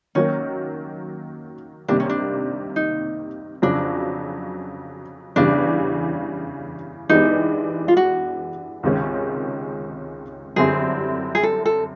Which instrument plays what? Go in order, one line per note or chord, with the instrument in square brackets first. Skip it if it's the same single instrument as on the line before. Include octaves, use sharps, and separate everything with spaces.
[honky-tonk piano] D#3 F#3 A#3 [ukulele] C#4
[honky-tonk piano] C3 D#3 G3 A#3 [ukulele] D4
[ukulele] C#4
D4
D#4
[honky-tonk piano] F2 C#3 F#3 [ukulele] D4
[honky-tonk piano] E2 C#3 E3 G3 [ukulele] D4
[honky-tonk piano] E3 G#3 B3 D4 G4 [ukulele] D#4
[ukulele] F4
F#4
[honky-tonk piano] C#2 C3 D#3 G#3 C#4
[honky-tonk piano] F#2 D3 G3 C4 E4 [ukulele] G#4
[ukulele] G#4
A4
A4